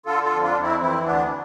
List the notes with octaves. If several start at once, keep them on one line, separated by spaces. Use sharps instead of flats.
D3 F4 A4
F4 A4
F2
D4 F4
F2
C4 E4
E3 C4 E4
D2 B3 D4